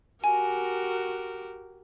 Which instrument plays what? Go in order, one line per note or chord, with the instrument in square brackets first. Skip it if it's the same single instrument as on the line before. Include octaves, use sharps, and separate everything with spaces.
[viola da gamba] F#4 G4 A#4 [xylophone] G#5